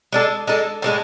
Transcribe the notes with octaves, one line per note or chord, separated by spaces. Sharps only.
G#3 D4 A4
G#3 D4 A4
A2 F3 G#3 D4